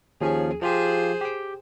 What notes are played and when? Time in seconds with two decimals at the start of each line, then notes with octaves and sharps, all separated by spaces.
0.21 D#2 F3 C#4 G#4
0.62 F3 F4 G4 G#4 C5
1.21 G4 G5